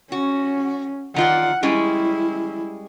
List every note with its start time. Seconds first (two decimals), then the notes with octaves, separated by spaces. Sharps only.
0.12 C#4 F#4
1.16 D#3 F4 D5 F#5
1.63 G3 G#3 C#4 E4